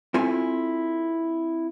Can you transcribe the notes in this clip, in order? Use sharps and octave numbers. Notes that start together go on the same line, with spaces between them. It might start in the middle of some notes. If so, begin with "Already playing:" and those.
C4 E4 F4 A4 G#5